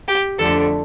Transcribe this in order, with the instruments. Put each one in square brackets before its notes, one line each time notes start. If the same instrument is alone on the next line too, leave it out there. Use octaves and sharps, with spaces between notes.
[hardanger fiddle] G4
[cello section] F2 D3 F3 A3 D4 [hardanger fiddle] A4